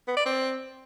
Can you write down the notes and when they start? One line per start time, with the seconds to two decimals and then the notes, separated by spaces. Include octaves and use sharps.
0.08 B3
0.17 D5
0.26 C4